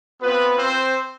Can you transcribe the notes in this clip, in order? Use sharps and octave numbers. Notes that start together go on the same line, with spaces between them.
B3 C4 F4 B4
C4 C5